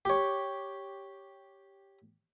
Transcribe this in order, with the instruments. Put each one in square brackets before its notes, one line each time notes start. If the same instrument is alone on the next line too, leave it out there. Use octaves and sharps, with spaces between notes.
[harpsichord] G4 C#5